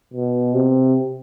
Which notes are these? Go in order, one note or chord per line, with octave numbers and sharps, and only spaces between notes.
B2
C3